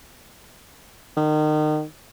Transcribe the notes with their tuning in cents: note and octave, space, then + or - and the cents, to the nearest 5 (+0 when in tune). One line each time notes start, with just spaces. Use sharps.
D#3 -30